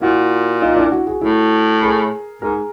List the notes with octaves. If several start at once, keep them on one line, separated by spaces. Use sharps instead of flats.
A#2 E4 F#4
D#4 F4
D4 E4
E4 F#4
F#4 G#4
A2 E4 F#4
G#4 A#4
G#2 G#4 A#4